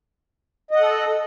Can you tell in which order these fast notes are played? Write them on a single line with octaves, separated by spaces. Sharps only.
D#5 F#5 A4